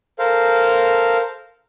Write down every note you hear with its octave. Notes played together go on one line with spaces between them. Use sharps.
A4 A#4 C5 F5